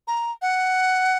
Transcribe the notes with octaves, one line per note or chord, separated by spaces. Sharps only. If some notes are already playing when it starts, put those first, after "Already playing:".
A#5
F#5